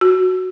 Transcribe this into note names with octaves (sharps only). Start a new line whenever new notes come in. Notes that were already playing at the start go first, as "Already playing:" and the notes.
F#4